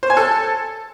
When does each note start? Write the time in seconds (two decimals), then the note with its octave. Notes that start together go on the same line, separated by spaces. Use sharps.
0.03 C5
0.10 G#5
0.17 A4